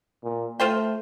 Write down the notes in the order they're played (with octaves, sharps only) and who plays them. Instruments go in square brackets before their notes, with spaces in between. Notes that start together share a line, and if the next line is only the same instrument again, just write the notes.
[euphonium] A#2
[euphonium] A3 [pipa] F4 C5 G5